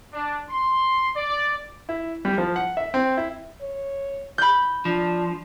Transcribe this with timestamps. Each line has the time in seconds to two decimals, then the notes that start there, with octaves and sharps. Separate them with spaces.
0.13 D4
0.49 C6
1.16 D5
1.89 E4
2.25 G3
2.38 F3
2.56 F#5
2.77 E5
2.94 C4
3.17 E4
3.61 C#5
4.38 B5 G6
4.85 F3 D4